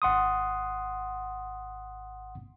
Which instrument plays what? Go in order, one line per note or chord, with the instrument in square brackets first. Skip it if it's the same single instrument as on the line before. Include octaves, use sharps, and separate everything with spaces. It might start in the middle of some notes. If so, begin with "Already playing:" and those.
[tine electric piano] G#1 F#5 C6 D#6